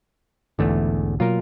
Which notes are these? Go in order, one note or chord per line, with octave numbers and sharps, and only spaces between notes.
B1 E2 G#2 D3 A3
B2 F#3 A#3 F4 A#4